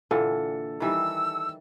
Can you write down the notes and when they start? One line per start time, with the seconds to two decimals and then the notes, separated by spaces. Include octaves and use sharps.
0.11 A#2 D3 E3 A4
0.80 D#3 E3 G3 E6